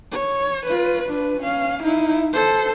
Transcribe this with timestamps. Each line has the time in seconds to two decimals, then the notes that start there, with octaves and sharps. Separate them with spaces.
0.12 C#5
0.66 F4 B4
1.09 D4 B4
1.40 C#4 F5
1.83 D#4 E4
2.33 A4 C5